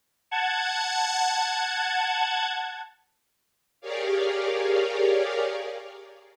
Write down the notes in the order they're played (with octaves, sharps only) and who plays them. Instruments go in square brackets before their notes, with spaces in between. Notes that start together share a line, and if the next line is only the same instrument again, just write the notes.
[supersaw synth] F#5 A5 G#6
[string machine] G4 G#4 A#4 C#5 D5 F5